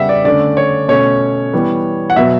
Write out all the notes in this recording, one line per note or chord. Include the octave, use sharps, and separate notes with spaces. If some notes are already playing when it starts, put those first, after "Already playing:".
Already playing: C#3 G3 B3 E5 F#5
D5
D3 A3 C#4 D5
C#5
B2 A3 C#4 C#5
E3 G3 B3
F#5
B2 F#3 B3 E5